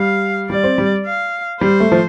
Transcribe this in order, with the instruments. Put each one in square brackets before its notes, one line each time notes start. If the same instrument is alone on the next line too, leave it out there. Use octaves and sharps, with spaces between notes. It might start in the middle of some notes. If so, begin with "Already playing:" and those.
Already playing: [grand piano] G3 [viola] F5
[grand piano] G3 [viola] D5
[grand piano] C4
G3
[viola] F5
[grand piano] G3 [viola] C5
[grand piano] A3
F3